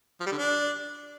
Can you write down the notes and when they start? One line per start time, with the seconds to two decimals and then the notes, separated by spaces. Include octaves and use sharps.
0.20 F3
0.26 G3
0.32 D3
0.38 D4